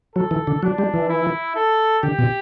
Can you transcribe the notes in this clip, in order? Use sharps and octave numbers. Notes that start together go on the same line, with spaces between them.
F#3 A4
E3
D3
F#3 D4
G3
E3
E4
A4
D3 G4
B2